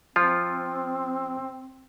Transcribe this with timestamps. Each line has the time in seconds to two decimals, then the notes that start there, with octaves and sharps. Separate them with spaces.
0.16 F3 C4 F4